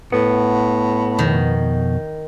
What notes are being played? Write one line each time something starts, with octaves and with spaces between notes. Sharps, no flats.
A2 B3 F#5
F2 B2 D#3